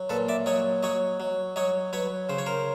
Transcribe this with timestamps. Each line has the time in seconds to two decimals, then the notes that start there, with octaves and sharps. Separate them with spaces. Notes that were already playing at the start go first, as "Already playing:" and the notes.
Already playing: F#3
0.10 A#2 A4 B4
0.29 D5 E5
0.46 F#3 C#5 D#5
0.83 F#3 C#5 D#5
1.20 F#3
1.56 F#3 C#5 D#5
1.93 F#3 B4 C#5
2.29 C#3 C5
2.38 C#5
2.46 A#4 C5